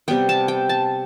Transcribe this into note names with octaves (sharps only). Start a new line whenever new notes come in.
C3 G3 B3 G5
A5
G5
A5